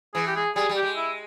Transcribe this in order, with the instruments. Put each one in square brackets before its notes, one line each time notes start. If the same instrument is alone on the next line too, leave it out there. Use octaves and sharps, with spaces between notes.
[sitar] E3 [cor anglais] G#4
[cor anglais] G4
G#4
[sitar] G3 [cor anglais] G#4
[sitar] G3
[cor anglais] G4
[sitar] G#3
[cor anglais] E4